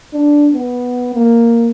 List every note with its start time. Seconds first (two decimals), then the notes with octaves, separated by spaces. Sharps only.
0.13 D4
0.54 B3
1.14 A#3